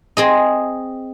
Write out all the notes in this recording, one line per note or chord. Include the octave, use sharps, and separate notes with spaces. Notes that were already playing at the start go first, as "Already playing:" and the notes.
C4 G#4 D#5